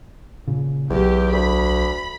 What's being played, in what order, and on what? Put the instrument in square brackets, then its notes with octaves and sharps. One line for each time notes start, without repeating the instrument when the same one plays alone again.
[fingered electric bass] A#2 C#3
[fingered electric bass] B1 F#3 [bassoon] E2 [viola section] G4
[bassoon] D2 [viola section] B5